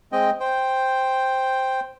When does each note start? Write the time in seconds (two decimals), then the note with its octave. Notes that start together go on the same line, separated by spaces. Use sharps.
0.12 G#3 C4 D#5 G5
0.40 C5 G5